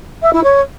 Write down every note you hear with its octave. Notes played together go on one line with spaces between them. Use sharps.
E5
E4
C#5